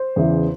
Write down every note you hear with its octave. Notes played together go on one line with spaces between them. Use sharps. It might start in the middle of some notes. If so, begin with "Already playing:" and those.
Already playing: C5
E2 C#3 E3